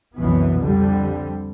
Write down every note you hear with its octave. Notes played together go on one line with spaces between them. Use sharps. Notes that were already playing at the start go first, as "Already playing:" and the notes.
C2 F#2 B2 E3 B3
F2 D3 G3